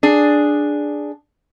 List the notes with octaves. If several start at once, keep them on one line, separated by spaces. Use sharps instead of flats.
D4 G#4